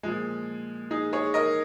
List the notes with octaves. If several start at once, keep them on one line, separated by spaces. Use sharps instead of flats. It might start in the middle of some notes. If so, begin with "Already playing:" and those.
A#2 F3 G#3
D#4 G#4
G#4 C#5
A#4 D#5